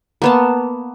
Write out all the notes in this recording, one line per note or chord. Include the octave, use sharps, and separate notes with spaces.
A#3 B3 A5